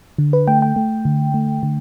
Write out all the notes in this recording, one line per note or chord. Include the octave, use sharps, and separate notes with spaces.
D3
B4
A3 G5
G5
A3
D3
A3
D3